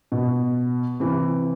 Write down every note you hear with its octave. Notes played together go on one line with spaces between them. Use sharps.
B2
C3 E3